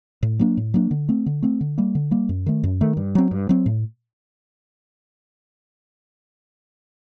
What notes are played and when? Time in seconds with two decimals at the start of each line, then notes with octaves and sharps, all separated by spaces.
0.23 A2
0.39 F#3 A#3 D4
0.57 A2
0.74 F#3 A#3 D4
0.91 D3
1.09 A3 C4
1.26 D3
1.43 A3 C4
1.61 D3
1.78 G3 A#3
1.95 D3
2.11 G3 A#3
2.29 F#2
2.46 D#3 A3
2.63 F#2
2.81 D#3 A3
2.97 G2
3.15 F#3 C4
3.31 G2
3.49 F#3 C4
3.66 A2